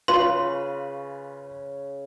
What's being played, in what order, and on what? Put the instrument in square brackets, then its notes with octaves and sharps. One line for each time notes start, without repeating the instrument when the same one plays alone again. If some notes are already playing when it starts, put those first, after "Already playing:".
[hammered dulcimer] C#3 C#6 [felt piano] F4 [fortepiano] B4 [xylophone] C6